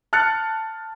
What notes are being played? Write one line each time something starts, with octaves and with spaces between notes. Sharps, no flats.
A5 F6 F#6 A6 C#7